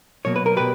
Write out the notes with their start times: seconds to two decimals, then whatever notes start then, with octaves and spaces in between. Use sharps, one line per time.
0.25 B2 F#3 A#3 C#5
0.36 B4
0.46 A#4
0.57 B2 G4 B4